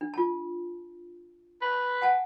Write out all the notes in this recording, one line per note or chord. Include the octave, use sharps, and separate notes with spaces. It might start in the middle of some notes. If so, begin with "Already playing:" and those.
D4
F4 A5
B4
F#5 G#5 A5